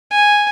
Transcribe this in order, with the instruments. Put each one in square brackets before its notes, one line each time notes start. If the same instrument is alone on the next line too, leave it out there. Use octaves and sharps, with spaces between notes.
[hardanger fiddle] G#5